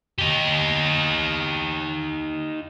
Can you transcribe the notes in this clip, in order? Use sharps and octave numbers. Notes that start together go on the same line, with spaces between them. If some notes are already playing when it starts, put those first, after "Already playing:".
D#4 G4